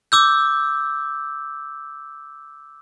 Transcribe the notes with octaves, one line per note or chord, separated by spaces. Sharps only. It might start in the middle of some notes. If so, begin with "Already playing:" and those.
D6 E6 G6